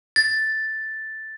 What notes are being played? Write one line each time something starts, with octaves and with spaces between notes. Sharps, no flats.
A6